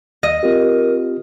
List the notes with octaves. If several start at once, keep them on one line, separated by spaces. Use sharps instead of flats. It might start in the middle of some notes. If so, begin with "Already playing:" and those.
D#2 D#5
C4 F4 G4 A#4